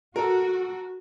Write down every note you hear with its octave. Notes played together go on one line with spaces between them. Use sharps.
F#4 A4 A#4